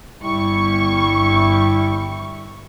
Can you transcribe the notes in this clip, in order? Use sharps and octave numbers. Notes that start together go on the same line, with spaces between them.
G1 G3 E4 C#6